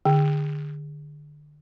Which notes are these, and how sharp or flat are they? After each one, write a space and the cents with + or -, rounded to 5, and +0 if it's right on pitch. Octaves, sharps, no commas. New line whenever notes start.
D3 +20